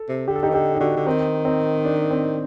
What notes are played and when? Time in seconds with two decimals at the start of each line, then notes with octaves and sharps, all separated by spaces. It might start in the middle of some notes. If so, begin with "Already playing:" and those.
Already playing: A4
0.09 C3
0.28 D3 G4
0.36 A4
0.43 D#4 G4
0.50 D#3
0.54 D3 D#4 G4
0.74 D#4
0.80 D3 D4 F#4
0.96 D3
1.07 D#3 C4 D#4
1.45 C4 D#4
1.85 D4
2.11 C4